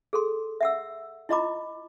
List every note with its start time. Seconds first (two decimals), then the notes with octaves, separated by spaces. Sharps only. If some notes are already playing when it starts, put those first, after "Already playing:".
0.13 G#4 A4 C6
0.61 E5 F#5 E6
1.29 E4 F4 D#5 A#5 B5 D6